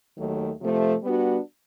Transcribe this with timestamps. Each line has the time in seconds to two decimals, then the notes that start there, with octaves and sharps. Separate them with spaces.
0.17 D#2 D#3 F#3 A3
0.60 C3 F3 A3
1.03 G3 B3 D4 F#4